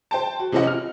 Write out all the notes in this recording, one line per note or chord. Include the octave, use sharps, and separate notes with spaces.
C5 G5 A5
F#4
C3 F3 C4 C#4 D#5 F#5
F6